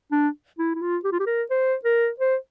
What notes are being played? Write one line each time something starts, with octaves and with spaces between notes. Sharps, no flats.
D4
E4
E4
F4
G4
F4
G4
A#4
C5
A#4
C5